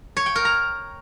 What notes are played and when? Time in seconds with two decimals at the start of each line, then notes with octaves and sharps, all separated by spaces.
0.17 C#5
0.26 G5
0.36 A#4
0.45 A#5